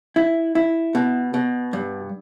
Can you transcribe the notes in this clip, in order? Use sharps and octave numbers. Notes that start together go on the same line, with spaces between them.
E4
E4
B2
B2
G2